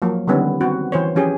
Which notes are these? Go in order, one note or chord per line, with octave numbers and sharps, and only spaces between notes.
F3 F#3 A#3
D3 D#3 G3 B3 C#4
C4 F#4
E3 C5 C#5
F3 C#4 G4 G#4